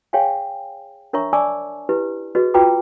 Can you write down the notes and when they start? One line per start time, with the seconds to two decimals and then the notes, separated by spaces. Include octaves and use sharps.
0.13 G#4 C#5 F5 G5 G#5
1.13 D4 A#4 C#5 E5 A#5 C#6
1.33 D5 G#5 A5 C#6 D6 E6
1.89 E4 G4 B4
2.35 F#4 G#4 B4 D#5
2.54 F4 F#4 B4 G5 A#5 D6